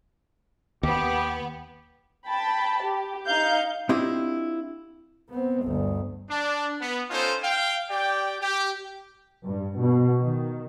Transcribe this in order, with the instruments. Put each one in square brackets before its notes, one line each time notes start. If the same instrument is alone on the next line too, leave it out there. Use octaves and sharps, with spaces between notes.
[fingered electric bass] D#2 [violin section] B3 [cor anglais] G4
[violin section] G5 A5 B5
G4
D#4 F5 G6
[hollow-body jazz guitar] C4 D4 E4 F4 G4 D#5
[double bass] B3 C4
G1 D2
[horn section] D4
B3
C#4 D#4 F4 A4 C5
F5 G5
G4 D5 G5
G4
[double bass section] G2
B2
D#3